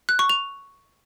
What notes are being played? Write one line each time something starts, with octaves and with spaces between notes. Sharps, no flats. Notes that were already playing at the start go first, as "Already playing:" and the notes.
F#6
C#6
F7